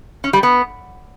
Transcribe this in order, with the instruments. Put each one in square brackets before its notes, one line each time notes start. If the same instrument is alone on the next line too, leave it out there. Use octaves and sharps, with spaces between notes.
[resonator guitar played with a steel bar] C#4
G3
B3